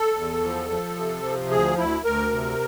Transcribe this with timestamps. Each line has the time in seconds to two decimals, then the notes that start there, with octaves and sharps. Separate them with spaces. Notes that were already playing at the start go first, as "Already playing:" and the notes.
Already playing: A4
0.16 E2
0.43 F3
0.70 F3
0.97 C3
1.24 F3
1.51 D2 G#4
1.78 D2 E4
2.05 D2 A#4
2.32 C3